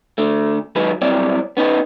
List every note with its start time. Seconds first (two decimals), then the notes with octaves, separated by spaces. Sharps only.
0.18 D3 A3
0.75 D#3 F#3 G#3 B4
1.01 B1 G3 C4 E4 C#5 D5
1.57 B3 C#4 D#4 B4